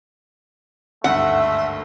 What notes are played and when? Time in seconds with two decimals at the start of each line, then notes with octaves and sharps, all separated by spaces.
1.04 G#1 D2 G2 A3 E5 F#5